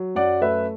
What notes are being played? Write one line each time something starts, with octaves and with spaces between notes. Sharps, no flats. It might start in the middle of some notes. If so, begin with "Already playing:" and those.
Already playing: F#3
F#2 D5 F#5
A3 B4 E5